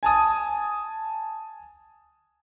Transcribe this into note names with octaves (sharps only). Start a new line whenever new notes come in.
G#5 A5 D#6